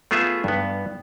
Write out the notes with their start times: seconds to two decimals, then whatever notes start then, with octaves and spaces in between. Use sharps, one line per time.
0.11 A3 B3 F4 G#4 E5
0.44 G2 B3